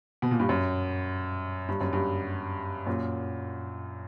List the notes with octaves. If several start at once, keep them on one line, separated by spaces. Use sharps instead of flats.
B2
A#2
G2
F#2
G2
F#2
G2
F#2 A#2